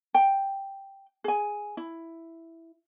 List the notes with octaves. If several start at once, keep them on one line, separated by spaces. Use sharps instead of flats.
G5
G#4 G#5
E4